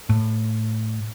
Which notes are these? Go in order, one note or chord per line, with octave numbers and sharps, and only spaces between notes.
A2